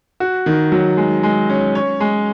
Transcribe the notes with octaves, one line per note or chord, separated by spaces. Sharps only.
F#4
D#3
F#3
G#3
G#3
C#4
C#5
G#3